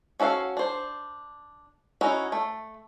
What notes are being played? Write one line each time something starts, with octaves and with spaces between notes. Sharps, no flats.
C#4 F#4 A4 E5 F5
D4 C5
C#4 D#4 E4 F#4
A3